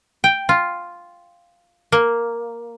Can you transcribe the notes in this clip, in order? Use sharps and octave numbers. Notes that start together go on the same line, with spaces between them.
G5
F4
A#3